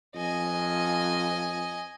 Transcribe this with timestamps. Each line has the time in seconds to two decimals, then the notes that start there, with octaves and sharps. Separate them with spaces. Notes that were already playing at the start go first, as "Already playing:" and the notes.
0.15 F2 D#5 G#5